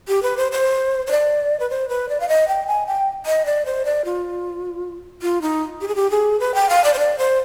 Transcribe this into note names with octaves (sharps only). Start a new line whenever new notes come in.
G4
B4
C5
C5
C5
D5
B4
C5
B4
D5
F5
D#5
G5
G#5
G5
D#5
D5
C5
D5
F4
F4
D#4
G4
G#4
G4
G#4
B4
G5
F5
D5
C5
D5
C5